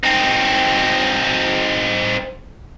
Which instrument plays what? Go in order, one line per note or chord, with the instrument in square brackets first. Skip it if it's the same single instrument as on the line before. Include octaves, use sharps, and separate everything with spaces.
[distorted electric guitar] C4 D#4